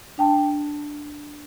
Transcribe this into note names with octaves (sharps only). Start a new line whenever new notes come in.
D4 G5 A5